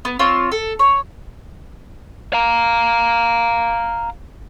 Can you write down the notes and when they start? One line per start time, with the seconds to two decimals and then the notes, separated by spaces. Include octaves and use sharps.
0.05 B3
0.19 C4 F4 C#5
0.52 A4
0.79 C#5
2.33 F5 A#5